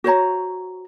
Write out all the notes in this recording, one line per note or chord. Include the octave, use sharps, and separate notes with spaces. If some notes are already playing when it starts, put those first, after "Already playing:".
F#4 C5 C#5 A#5